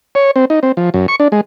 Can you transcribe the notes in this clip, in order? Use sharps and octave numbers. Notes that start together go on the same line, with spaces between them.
C#5
C4
D#4
C4
F3
F#2
C#6
D4
G#3